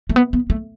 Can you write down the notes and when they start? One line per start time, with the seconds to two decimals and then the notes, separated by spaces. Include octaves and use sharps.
0.09 A3
0.16 B3
0.33 B3
0.50 A3